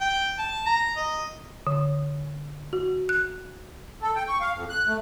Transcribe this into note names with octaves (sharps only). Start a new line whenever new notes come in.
G5
A5
A#5
D#5
D3
F#4
F#6
A4
G5
C#6
F5
F2
F#6
A3